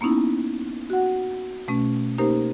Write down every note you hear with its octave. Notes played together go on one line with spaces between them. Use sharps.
A#3 B3 C#4 D#4 E4
F#4 F#5
B2 A3 C#4
A#3 D#4 G4 A#4 C5